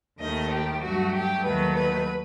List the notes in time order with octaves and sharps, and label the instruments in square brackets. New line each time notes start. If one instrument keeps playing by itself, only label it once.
[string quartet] D#2 D#3 A3 D#5
G4
G2 F#3 A3 F#4
G4
D#2 D#3 F#3 A3 B4
B4